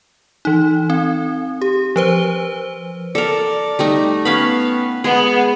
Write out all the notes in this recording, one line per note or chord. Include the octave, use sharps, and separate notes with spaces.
E3 D#4
C4
G4
F3 B4 C5 G7
A4 A#4 D5
G3 A3 D#4
B3 C#4 F5 B5
G#3 B3 G#4